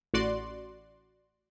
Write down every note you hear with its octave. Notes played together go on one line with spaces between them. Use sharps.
A1 F#4 D5 C6